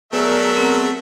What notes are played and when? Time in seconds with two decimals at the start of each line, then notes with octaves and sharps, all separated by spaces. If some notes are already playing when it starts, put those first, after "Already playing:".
0.13 F#3 A3 B3 G#4 A#4 D5 E5 E6
0.57 C4 D5 F#5